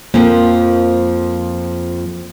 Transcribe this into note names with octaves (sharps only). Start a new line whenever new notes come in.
F2 F3 A#3